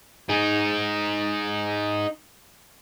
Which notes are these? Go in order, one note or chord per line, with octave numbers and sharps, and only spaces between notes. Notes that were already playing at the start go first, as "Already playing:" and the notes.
D#4 G#4